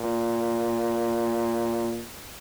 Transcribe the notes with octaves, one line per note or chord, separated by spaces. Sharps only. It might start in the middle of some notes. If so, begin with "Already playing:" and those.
Already playing: A#2